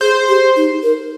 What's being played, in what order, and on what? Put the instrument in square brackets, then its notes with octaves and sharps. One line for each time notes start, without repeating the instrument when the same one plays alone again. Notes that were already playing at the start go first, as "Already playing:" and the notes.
[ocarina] G#4 [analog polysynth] C5
[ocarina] G4
D#4
A#4